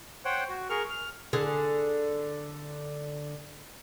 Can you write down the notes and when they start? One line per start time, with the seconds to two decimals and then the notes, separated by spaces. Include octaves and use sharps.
0.25 C5 C#5 F#5 G5
0.49 F#4
0.70 G#4 A#4 C#6 F6
0.90 F6
1.33 D3 G#4